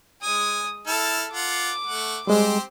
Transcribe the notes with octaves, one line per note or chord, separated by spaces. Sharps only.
G#3 G#5 D#6
E4 A4 A5 F6
F4 F#5 D6
A3 F#5
G3 G#3 C4 G4 C5